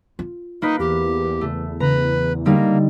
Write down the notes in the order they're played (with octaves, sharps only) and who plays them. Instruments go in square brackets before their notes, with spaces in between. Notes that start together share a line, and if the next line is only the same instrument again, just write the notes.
[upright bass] F4
[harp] A#3 B4 [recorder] D#4
[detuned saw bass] E2 [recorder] G4
[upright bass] C#3 [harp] A3
[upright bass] C#3 D4 [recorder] B4 [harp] A#5
[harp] D3 G3 D#4 [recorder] A#3